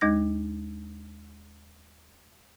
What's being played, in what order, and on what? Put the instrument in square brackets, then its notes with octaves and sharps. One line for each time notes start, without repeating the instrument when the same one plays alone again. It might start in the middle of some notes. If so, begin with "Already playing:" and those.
[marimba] D#2 G#3 D#4 G#6 A#6